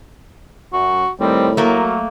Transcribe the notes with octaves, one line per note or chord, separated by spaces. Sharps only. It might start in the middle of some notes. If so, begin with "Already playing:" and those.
F#2 F#4
A2 D#3 G3 C4
F#3 A3 A#3 F#4 A#4